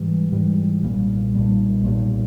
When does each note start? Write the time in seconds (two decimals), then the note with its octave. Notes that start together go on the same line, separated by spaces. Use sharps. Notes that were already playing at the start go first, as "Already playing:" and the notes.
Already playing: G#2 E3 G3
0.32 G#2 E3 G3
0.83 B1 A#2 G3 A#3
1.34 B1 A#2 G3 A#3
1.84 B1 A#2 G3